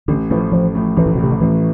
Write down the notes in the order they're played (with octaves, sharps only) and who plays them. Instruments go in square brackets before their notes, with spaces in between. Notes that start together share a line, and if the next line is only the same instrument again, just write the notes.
[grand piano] A1 [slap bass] D3
[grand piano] A2 F3 [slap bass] E3
[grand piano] A1 [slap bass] F3
[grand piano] A2 F3
[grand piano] A1 [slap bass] E3
[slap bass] A2
B2
[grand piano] A2 F3 [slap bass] C3
[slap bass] D3
[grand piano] A1 [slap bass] E3